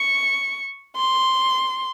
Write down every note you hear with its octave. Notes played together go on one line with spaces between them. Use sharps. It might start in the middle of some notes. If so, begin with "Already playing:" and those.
Already playing: C#6
C6